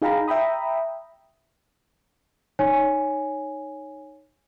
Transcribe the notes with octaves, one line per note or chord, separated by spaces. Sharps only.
D#4 G#4 F5 G5 A#5 B5
E5 G5 A#5 B5 D#6
D#4 C#5 G#5